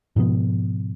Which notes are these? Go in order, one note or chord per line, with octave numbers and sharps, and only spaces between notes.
G#2 B2 F3 B3